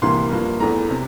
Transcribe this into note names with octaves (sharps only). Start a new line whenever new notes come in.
C2 C3 E3 A#3 C6
G2 F3 A#3
E2 E3 A3 A#5
C3